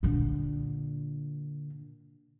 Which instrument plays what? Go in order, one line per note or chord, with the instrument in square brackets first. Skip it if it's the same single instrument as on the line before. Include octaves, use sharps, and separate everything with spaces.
[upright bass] A#2 D3